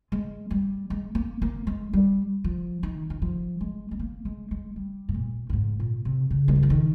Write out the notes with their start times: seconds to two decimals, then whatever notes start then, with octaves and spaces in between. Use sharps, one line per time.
0.12 G#3
0.50 G3
0.90 G#3
1.15 A#3
1.42 A#3
1.67 G#3
1.93 G3
2.44 F3
2.83 D#3
3.10 D#3
3.22 F3
3.61 G#3
3.91 G#3
3.99 A#3
4.25 G#3
4.51 G#3
4.76 G3
5.09 G#2
5.14 A#2
5.50 A#2
5.53 G#2
5.80 A#2
6.05 C3
6.30 C#3
6.48 G#3
6.56 G3
6.63 F3
6.70 D#3